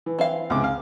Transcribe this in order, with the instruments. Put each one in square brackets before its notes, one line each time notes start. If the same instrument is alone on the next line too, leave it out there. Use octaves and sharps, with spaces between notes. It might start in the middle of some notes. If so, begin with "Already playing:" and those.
[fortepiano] E3
[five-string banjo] C4 E4 F5
[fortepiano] C#2 C3 D6
F5